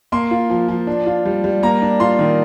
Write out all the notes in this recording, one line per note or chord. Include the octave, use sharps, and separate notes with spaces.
A#3 C6
F4
F3
F3
D4
F4
G3
G3
A#3 A#5
D4
F4 C6
D#3